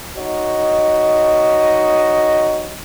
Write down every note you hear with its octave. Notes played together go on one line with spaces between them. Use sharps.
D#4 F#4 C#5 D#5